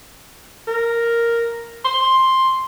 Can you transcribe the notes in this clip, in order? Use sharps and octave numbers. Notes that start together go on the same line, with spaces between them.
A#4
C6